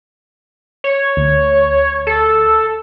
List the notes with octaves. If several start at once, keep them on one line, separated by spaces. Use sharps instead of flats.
C#5
D2
A4